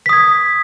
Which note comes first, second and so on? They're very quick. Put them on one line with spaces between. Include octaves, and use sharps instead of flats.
B6 D#6 G#6